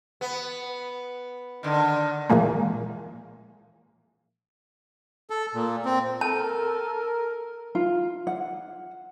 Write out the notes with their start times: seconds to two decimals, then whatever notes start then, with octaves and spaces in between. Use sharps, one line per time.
0.21 B3
1.63 D3 D#3
2.30 A#2 E3 F3 G#3 A#3
5.30 A4
5.54 A#2
5.85 C4
6.21 A4 A#4 A5
7.75 F4
8.27 F#5